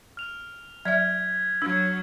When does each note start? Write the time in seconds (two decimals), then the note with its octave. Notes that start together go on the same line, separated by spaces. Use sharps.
0.17 F6 F7
0.85 F#3 D5 E5 F6 G#6 B6
1.62 F#3 D4 E6 G#6